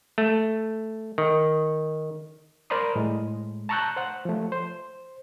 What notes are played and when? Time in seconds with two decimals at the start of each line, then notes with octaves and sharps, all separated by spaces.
0.18 A3
1.18 D#3
2.70 A#4 C5 D5 B5 C6 D#6
2.96 A2 G#3
3.69 A5 A#5 C#6 E6 F#6 G6
3.96 C5 F#5
4.25 F3 A3
4.52 C5